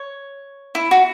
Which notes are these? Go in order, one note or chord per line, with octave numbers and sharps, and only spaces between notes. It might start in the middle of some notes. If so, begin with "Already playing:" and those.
Already playing: C#5
E4
F#4